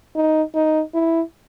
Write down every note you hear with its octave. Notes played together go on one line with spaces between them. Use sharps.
D#4
D#4
E4